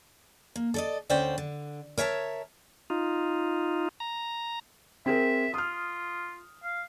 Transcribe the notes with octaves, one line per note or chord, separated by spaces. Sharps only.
A#3
A4 D5 D#5
D2 D3 C#4 C5 D5 G5
D3
A#4 C#5 E5 G#5 A5
D#4 F4
A#5
C4 G#4 A#4 E5
F4 D#6 F6
F5